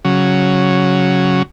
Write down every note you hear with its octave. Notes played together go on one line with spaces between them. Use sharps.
C#3 F#3